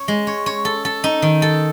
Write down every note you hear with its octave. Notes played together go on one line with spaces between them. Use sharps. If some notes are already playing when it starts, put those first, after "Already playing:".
Already playing: C#5
G#3
C#5
C#5
A4
A4
D#4
D#3
A4